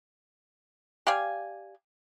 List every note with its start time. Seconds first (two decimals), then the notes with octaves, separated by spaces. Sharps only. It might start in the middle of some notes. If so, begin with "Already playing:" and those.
1.07 G4 D5 F5 G#5